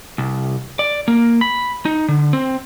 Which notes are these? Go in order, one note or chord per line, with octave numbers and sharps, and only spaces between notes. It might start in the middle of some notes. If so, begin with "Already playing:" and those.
C2
D5
A#3
B5
D#4
D3
C4